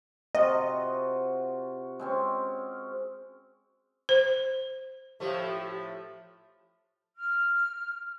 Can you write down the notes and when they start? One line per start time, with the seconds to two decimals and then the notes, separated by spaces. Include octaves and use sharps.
0.35 C3 F4 F#4 D#5
2.00 G#3 C4 C#4
4.09 C5
5.20 A2 F3 A3 G4
7.17 F6